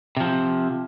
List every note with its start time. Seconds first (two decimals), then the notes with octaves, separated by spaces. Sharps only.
0.17 C3 F3